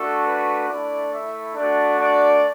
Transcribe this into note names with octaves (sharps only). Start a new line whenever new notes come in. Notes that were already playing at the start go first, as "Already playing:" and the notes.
Already playing: A3 D4 F#4 A4
B4
A3 D4 E4 D5
E4 E5
A3 D4 F#4 D5
D4 D5